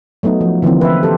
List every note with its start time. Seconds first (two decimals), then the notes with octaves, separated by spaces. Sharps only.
0.23 F#3 A3 B3 D#4
0.41 F3
0.62 D3 E3 F3 A#3 C4
0.81 B4 E5
1.03 G4 A4 C5